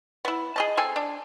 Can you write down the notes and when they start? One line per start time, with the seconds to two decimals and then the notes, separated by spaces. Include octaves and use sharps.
0.25 B3 E4
0.56 G#4 D#5 A5
0.77 C4 A4 G#5
0.96 D4